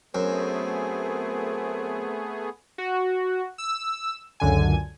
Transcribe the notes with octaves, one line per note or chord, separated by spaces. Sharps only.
F#2 A3 B3 C4 G#4
F#4
E6
C#2 F#2 D3 G#5